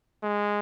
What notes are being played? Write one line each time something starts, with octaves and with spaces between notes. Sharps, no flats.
G#3